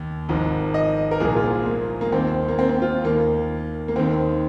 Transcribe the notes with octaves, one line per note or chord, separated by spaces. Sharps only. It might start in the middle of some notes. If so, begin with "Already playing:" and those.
Already playing: D#2 D#3
G#1 G#2 F3
D#5
A#4
C2 A#2 F3 G#4
F4
A#3
A#3
D#2 D#3 C4
A#3
C4
C4
F4
D#2 D#3 A#3
A#3
D#2 D#3 C4